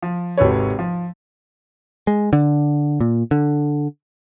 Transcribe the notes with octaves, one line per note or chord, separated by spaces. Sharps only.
F3
G#1 C3 F#4 A4 B4 C#5
F3
G#3
D3
A#2
D3